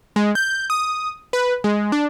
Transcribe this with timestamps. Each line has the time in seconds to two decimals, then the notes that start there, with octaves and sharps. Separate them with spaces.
0.16 G#3
0.35 G6
0.70 D#6
1.33 B4
1.64 G#3
1.92 D4